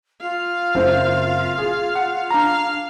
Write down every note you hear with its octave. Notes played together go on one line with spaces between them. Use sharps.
F4 F5
F#1 C4 C5
G#4
F#5
D4 F5 A#5